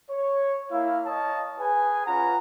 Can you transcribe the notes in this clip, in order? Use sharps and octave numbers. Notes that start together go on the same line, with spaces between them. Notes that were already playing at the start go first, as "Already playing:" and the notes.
C#5
A#3 E4 F5
C#5 D#5 F5 A5
G#4 B4 G#5
C#4 F4 B4 F#5 A#5